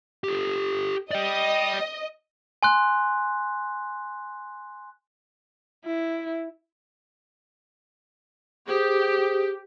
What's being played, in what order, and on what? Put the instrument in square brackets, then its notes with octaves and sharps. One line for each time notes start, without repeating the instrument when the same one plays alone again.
[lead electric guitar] G4 A4
[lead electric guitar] D5 G5 [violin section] D#5
[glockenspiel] G#5 C6 F#6
[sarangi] E4
[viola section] G4 [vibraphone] G#4 C5 D#6